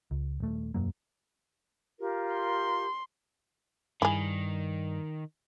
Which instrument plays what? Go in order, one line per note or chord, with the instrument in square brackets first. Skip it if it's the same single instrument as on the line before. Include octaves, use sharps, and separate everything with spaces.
[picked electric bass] C#2
D#1 A3
E1 F#2 F#3 A#3
[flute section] F4 G4 A#4
[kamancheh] C6
[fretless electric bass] G2 [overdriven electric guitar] D#3 [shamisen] E4 G#4